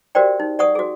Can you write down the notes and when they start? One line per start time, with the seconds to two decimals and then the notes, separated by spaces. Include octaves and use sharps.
0.15 F#4 G4 A#4 C5 D5 G5
0.40 D#4
0.59 D5 F#5 C#6 D#6
0.75 F#4 G#4